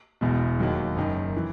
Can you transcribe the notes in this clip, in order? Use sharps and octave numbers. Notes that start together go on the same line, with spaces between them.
E1 E2 B2
D#2 D#3 F#3
F#1 F#2 D#3
E3